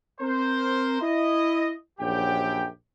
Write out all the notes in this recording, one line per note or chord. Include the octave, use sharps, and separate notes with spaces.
C4 A#4 C5
E4 D#5
A#1 F#2 G4 G5